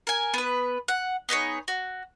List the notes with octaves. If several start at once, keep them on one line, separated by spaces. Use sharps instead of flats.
A#4 G#5
B3 B4
F#5
B3 D#4 G#4 C#5
F#4